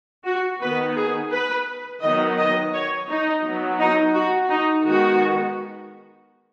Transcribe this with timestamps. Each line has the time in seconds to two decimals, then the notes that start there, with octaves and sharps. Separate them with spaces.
0.25 F#4
0.60 D#3 B3 B4
0.96 G#4
1.32 B4
2.02 D#3 F#3 B3 D#5
2.37 D#5
2.73 C#5
3.08 D#4
3.44 F#3 B3
3.79 D#4
4.15 F#4
4.49 D#4
4.85 D#3 G#3 B3 F#4